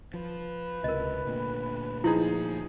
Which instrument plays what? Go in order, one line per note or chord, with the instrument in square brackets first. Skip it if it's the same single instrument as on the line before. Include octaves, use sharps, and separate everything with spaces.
[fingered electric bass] F3 [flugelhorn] B4
[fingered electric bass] C#2 C3 [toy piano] A#4 D#5
[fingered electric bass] D2 A#2 D3
[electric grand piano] F3 D#4 G#4 [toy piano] E4